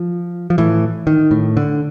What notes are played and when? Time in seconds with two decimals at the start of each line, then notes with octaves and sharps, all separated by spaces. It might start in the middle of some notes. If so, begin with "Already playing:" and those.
Already playing: F3
0.50 F3
0.58 A2 E3
1.07 D#3
1.31 A2
1.57 D3